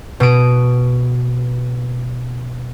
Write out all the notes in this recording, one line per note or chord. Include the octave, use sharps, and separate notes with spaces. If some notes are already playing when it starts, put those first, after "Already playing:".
B2 D#6 D7